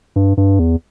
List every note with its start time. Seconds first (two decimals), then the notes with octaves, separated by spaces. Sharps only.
0.16 G2
0.37 G2
0.59 E2